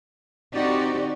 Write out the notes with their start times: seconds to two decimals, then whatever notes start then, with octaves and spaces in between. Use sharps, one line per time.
0.54 D3 C4 D#4 F#4 G4 D5